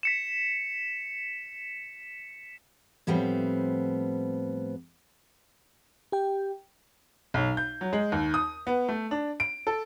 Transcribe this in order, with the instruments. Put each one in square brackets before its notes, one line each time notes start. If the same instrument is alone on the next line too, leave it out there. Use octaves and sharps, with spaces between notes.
[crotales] B6 C#7 E7
[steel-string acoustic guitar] A2 F3 G3 B3 C4
[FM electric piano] G4 G5
[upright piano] B1
G6
F#3
G#3
D#2
D#6
B3
A3
D4
D7
A4